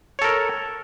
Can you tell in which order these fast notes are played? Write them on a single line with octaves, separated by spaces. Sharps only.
C#5 A4 A#4